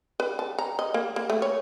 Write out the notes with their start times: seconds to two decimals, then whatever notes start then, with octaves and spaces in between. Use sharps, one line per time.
0.20 B4
0.39 A5
0.59 A#5
0.79 D#5
0.94 A#3
1.16 A#3
1.30 A3
1.42 C#5